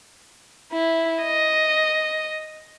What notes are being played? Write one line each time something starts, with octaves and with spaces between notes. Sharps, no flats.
E4
D#5